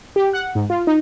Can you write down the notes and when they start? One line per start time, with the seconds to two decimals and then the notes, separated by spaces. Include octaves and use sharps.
0.16 G4
0.33 F#5
0.55 G#2
0.70 F4
0.87 D#4